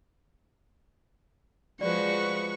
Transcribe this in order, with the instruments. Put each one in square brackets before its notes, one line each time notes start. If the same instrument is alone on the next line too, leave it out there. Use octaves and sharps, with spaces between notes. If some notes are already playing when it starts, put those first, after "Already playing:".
[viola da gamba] F3 G#3 F#4 [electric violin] B4 C#6 [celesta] D5